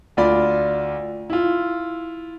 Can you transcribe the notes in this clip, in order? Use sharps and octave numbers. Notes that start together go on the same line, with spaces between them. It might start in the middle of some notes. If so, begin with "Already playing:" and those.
D2 F4 D5 B5
E4 F4